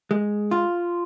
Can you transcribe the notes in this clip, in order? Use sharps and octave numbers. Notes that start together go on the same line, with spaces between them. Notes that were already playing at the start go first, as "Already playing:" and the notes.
G#3
F4